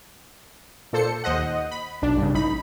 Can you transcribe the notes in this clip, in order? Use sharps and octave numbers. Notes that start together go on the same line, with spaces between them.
A#2 A4 C5 C#7
D#2 C5 D#5 F#5
B5
B1 D4
G2 C#3
A1 D#4 B5